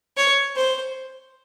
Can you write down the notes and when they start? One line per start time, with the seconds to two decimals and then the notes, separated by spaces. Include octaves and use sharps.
0.17 C#5
0.56 C5